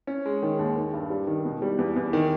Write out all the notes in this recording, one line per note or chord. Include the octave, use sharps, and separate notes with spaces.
C#4
G#3
D#3
D#2
D#3
G2
G3
D#3
B2
G3
E2
E2
D#3